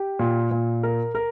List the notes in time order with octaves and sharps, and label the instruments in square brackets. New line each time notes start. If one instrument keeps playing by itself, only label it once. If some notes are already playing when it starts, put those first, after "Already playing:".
Already playing: [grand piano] G4
A#2
A#2
A#4
A#4